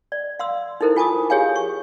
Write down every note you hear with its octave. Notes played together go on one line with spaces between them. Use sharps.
D5
F5 C6 E6
D#4 E4 A4 A#4 C5
F4 G#5 A5 D6 D#6
G4 G#4 C#5 F5 G#5
C#6